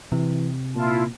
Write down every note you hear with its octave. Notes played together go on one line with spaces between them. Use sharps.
C3 E3
A#2 E4 F4 A5